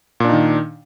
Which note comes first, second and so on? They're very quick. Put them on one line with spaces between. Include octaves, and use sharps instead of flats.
A#2 D4 D#4 D#3